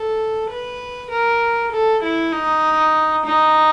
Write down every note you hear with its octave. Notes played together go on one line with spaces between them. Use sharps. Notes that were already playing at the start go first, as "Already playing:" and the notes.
Already playing: A4
B4
A#4
A4
E4
D#4
D#4